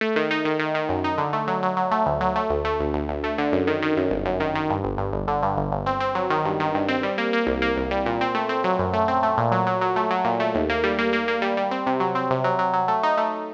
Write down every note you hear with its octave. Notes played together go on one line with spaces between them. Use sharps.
A3
D#3
D#4
D#3
D#3
D#3
F#2
D#4
D3
A3
F#3
F#3
F#3
A3
D2
F#3
A3
D2
A3
D2
D2
D2
A3
D3
F#2
D#3
D#3
F#2
G1
F#2
D#3
D#3
G2
G1
G2
G1
D3
G2
G1
G1
C4
C4
F#3
D#3
G2
D#3
G2
C4
G3
A#3
A#3
C2
A#3
C2
G3
A#2
C4
A3
C4
F#3
F#2
A3
C4
A3
A#2
F#3
F#3
F#3
A3
F#3
A#2
A3
D#2
A#3
G3
A#3
A#3
A#3
G3
G3
C4
C3
F#3
C4
C3
F#3
F#3
F#3
A3
D#4
A3